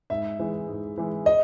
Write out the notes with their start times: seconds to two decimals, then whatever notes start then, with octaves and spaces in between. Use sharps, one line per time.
0.10 G#2 E5
0.39 E3 G#3
0.68 G#2
0.98 E3 G#3
1.26 D#5